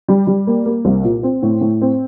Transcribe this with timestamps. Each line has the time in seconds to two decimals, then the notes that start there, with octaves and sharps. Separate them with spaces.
0.08 G3
0.27 G3
0.47 A#3
0.66 A#3
0.85 C2
1.04 A#2
1.23 C4
1.43 A2
1.61 A2
1.81 C4